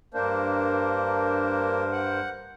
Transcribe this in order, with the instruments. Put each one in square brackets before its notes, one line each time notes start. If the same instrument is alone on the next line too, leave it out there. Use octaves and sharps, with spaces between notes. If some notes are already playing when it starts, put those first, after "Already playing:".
[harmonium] G2 A#4 C5 [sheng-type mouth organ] A#3 D4
[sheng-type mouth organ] F#5